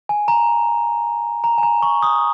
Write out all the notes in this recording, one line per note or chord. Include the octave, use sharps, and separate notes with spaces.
G#5
A#5
A#5
G#5
A#5
C#6
D#6